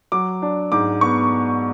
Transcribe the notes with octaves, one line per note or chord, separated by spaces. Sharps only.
F#3 D6
D4
G#2 D6
B3 C#6